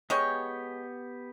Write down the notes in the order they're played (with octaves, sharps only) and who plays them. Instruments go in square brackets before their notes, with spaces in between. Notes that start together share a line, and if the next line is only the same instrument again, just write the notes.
[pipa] G#3 C#5 [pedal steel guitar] B3 G4 G5